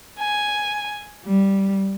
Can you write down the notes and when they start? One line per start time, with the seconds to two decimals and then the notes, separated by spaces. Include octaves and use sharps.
0.19 G#5
1.24 G3